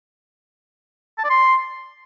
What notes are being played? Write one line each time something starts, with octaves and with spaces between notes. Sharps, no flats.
A5
D5
C6